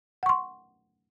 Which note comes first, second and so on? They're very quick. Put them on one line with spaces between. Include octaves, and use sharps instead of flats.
F#5 C#6 C6